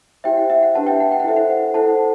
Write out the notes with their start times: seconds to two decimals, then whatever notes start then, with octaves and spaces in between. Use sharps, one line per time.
0.24 E4 G4 C5 E5 G5
0.37 F#5
0.50 E5
0.63 F#5
0.75 D4 G4 B4 F#5 A5
0.87 E5 G5
1.00 F#5
1.12 G5
1.20 F#5
1.24 E4 A4 C5 E5
1.37 F#5
1.74 E4 A4 C5 F#5 A5